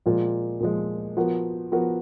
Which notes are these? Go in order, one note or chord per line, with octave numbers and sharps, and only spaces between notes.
A#2 F3 G#3
A#2 F3 G#3
F3 B3 F#4 A#4
F3 B3 F#4 A#4